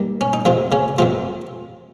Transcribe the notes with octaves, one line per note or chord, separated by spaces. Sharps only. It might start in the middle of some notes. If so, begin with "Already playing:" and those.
Already playing: D#2 D#3 G3 G4
C#4
D#4
F2 C3 F3 F4
C#3 C#4
F2 C3 F3 F4